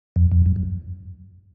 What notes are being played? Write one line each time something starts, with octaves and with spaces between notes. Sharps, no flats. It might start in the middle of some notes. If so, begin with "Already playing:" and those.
F2
F2
F#2
F#2